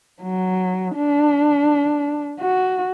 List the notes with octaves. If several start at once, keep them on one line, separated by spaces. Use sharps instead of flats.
F#3
D4
F#4